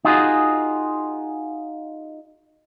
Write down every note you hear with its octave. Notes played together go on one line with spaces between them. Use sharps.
D#4 F4 F#4 G#4